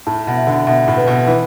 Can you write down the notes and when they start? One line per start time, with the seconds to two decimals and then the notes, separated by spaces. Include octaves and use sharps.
0.07 A2 A5
0.27 B2
0.37 E5
0.47 D3
0.67 B2 E5
0.88 A2
0.97 B4
1.08 B2
1.28 E3 B4